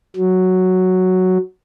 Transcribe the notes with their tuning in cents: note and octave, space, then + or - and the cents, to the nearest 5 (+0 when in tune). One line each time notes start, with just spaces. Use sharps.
F#3 +0